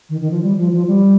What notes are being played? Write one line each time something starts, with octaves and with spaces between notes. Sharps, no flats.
D#3
D#3
F3
G3
F3
F3
G3